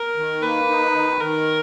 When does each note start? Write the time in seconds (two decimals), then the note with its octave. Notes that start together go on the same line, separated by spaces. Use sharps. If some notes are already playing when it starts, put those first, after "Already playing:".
Already playing: A#4
0.16 D#3
0.42 A#3 B4
0.68 D#4
0.95 D#3
1.21 D#3 A#4